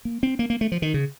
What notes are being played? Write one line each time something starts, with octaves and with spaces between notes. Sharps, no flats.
A#3
C4
A#3
A#3
A3
F3
D#3
C#3